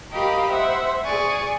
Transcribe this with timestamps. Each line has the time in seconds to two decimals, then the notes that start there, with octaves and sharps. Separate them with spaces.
0.12 G4 A#4 D#5 F5 B5
0.49 C5 E5 F#5
1.04 G#4 D5 G#5 C#6